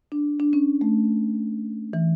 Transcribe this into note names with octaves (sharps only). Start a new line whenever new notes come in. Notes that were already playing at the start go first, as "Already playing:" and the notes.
D4
D4
C#4
A3
E3